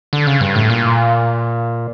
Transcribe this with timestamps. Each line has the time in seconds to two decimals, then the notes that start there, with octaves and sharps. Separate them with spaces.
0.13 D3
0.27 C#3
0.41 G2
0.55 A2
0.70 A#2